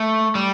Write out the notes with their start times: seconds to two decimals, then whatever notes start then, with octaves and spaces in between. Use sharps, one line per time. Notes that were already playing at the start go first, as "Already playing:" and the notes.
Already playing: A3
0.35 G3